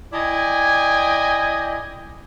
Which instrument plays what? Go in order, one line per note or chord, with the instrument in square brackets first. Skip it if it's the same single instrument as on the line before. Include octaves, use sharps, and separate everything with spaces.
[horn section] E4 D5 D#5 G5 G#5